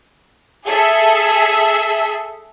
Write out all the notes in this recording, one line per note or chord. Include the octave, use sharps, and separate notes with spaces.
G#4 A4 E5